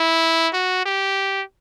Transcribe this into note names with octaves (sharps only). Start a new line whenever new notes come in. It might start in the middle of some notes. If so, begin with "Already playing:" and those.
Already playing: E4
F#4
G4